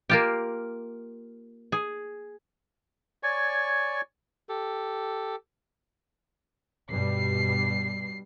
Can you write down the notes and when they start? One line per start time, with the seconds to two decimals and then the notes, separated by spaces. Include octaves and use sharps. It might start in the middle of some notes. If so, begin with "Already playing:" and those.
0.09 A#3 F4 G4
1.72 G#4
3.23 C#5 D5 G#5 C#6
4.49 G4 A4
6.91 G2 B2 G3 C7